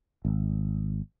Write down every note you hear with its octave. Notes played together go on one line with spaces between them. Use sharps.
G#1